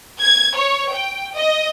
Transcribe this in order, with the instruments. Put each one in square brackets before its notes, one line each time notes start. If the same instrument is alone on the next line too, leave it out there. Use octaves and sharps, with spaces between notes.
[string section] G#6
C#5
G5
D#5